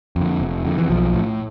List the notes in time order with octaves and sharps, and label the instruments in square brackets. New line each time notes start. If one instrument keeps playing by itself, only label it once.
[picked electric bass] F2 D3
F1
F2 D3
E3
B1 F3
A2